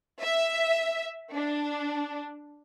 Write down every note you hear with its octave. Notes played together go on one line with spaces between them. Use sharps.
E5
D4